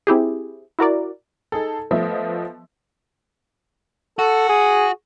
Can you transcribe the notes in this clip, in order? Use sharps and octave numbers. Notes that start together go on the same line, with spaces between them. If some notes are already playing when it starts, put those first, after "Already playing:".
C4 E4 G4 G#4
E4 F#4 A#4 D5
D#4 G#4 A4
F3 A3 B3 D#5 E5
F#4 A4
G#4